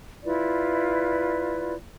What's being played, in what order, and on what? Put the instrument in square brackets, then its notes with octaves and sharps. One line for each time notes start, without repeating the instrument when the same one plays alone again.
[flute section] E4 F4 B4 D5